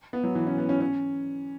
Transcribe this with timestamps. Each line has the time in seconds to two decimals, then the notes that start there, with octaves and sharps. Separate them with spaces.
0.13 B3
0.24 F#3
0.35 E3
0.47 C#4
0.58 B3
0.69 C#4
0.81 C#4